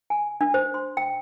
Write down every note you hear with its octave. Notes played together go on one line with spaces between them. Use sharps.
G#5
D4
C5
C6
G5